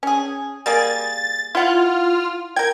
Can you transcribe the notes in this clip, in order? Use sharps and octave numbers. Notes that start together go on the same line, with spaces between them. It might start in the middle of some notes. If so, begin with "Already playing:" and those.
C#4 G#4
G3 A#3 G#4 A6
E4 F4 F#5
A#4 G5 G#6